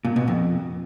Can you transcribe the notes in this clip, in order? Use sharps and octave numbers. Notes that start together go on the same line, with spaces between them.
A#2
B2
F2